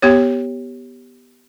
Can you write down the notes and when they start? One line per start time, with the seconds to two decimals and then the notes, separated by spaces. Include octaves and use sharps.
0.02 B3 G4 C#5